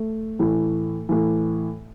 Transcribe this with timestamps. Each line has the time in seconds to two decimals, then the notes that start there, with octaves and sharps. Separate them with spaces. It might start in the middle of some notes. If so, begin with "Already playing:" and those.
Already playing: A3
0.39 A2 E3
1.09 A2 E3